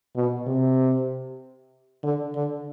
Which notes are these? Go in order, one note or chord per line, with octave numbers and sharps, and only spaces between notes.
B2
C3
D3
D3